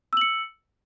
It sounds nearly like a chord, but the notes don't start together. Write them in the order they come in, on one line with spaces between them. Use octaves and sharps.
E6 F#7 C#7